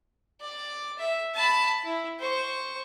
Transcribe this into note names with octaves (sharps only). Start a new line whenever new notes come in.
D5
E5
A5 B5
E4
C5 C#6